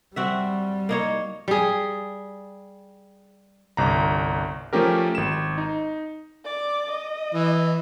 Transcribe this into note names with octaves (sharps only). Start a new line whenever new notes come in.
G3 C4 F#4 E5
A#3 D#4 C#5
G3 G#4
G1 C2 A#5
F3 A3 C#4 G4 A#4
G#1 E7
D#4
D5 D6
D#5
E3